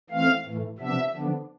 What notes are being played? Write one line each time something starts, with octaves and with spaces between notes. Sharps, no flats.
E3 A3 C4 F5
A2 E3 A3
C3 F3 B3 D4 E5
D3 F3 B3 D4